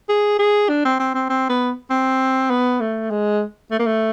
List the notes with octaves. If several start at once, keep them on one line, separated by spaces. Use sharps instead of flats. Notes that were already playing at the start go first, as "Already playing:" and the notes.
G#4
G#4
D4
C4
C4
C4
C4
B3
C4
B3
A3
G#3
A3
A#3
A3